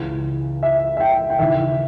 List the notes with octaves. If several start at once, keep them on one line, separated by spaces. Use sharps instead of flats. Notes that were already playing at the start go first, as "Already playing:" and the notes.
Already playing: C#2 C#3 E3
E5
E5
G5
G5
D#2 C#3 E3 E5